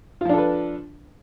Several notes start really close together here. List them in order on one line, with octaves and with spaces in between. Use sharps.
F4 F3 D4 A4 B4